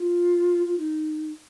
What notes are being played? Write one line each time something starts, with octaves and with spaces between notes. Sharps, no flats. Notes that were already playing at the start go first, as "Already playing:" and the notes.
Already playing: F4
F4
D#4